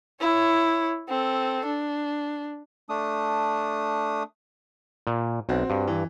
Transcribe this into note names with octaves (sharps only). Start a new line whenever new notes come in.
E4 C#5
C4 A4
D4
A3 D4 D#6
A#2
B1 C4 F#4
G2
E3